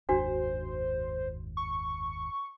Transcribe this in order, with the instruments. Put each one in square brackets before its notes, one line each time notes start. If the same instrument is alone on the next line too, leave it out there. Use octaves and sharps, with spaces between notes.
[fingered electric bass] F#1 D#2 G#2 [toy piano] D4 F#4 [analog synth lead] C5
[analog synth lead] C#6